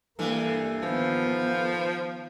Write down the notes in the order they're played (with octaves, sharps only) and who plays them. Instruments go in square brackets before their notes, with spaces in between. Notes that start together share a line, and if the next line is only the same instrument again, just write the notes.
[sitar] G2 E3 A3 [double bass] A#3
[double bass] D#3 B3 [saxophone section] F3